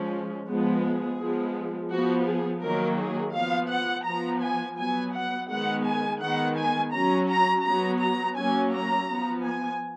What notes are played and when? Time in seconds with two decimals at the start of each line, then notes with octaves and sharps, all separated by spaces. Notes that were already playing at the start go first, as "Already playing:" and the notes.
Already playing: F3 G#3 C#4
0.47 F3 G#3 B3
0.82 G#4
1.18 F3 G#3 B3
1.90 F3 B3 F#4
2.26 G#4
2.62 D#3 F#3 A#3 A#4
2.98 G#4
3.34 F3 B3 F5
3.70 F#5
4.06 F3 B3 A#5
4.42 G#5
4.78 F#3 B3 G#5
5.14 F#5
5.49 D#3 G#3 B3 F#5
5.85 G#5
6.21 D#3 G#3 B3 F#5
6.57 G#5
6.93 F#3 C#4 A#5
7.29 A#5
7.65 F#3 B3 A#5
8.01 A#5
8.36 F#3 A#3 C#4 G#5
8.73 A#5
9.09 F3 B3
9.45 G#5